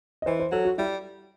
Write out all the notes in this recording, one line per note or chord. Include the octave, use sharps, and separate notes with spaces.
D#5
E3 C5
C5
F#3 A4
F#4
G3 E4